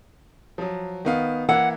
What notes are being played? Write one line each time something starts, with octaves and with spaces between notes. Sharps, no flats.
F3 F#3
D#3 B3 F5
E3 A#3 F#5 E6